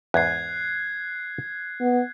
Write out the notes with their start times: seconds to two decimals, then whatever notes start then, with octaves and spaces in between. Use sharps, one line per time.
0.14 E2 G#2 F#6 G#6 C7
1.81 B3